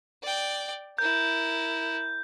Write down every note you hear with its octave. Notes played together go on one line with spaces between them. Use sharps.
D5 G5
E4 A#4 G6